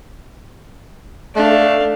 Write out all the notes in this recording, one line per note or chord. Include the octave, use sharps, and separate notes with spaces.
A3 D4 F5